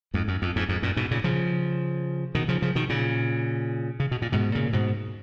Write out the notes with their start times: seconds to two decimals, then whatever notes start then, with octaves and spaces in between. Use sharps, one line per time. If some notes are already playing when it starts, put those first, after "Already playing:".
0.14 F2 G#2
0.28 F#2
0.42 F2
0.56 F2 G#2
0.69 F2 G#2
0.82 F#2 A#2
0.96 G#2 B2
1.11 A#2 C#3
1.24 C#3 F3
2.35 B2 D#3
2.48 C#3 F3
2.62 C#3 F3
2.75 B2 D#3
2.89 A#2 C#3
4.00 C#3
4.11 B2
4.22 A#2
4.32 G#2 B2
4.55 A#2 C#3
4.73 G#2 B2